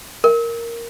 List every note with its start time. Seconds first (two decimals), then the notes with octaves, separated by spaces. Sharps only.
0.24 A#4